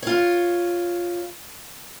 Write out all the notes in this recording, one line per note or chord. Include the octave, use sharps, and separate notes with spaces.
F4 C#5